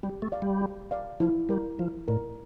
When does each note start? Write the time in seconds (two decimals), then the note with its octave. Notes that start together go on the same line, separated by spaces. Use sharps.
0.03 G3 G4
0.22 A3
0.32 D5 F5
0.42 G3
0.62 G4
0.91 D5 F5
1.20 F3 E4
1.49 G3 A#4 D5
1.79 F3 E4
2.08 A2 A#4 D5